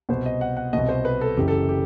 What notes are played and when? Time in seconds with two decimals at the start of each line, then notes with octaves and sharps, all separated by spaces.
0.09 C2 B2 C5
0.26 D#5
0.41 F#5
0.57 F#5
0.73 C2 B2 D#5
0.89 C5
1.05 B4
1.21 A4
1.37 F#1 F#2 E3 G4
1.48 A4
1.69 G4